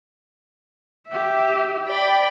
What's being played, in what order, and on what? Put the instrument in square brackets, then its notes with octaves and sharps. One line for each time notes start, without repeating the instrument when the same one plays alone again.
[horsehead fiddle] G4 E5
[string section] D5 G5 B5